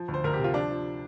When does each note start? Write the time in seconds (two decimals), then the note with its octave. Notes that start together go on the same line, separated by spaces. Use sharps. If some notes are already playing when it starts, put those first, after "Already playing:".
Already playing: F3
0.08 D2
0.14 C5
0.24 D2 A#4
0.34 G4
0.39 C3
0.44 F4
0.54 F3 D4
0.70 F3